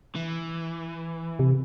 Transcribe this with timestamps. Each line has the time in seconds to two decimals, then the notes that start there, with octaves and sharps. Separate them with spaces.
0.16 E3
1.39 C3